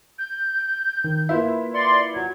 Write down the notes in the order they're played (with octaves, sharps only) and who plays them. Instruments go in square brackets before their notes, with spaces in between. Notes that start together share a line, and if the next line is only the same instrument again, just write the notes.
[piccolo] G6
[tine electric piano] D#3
[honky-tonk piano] A#3 E4 [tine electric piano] F4 B4 E5
[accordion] D5 C6 [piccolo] C#7
[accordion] F#3 [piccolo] G#6